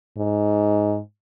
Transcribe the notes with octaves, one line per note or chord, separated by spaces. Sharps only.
G#2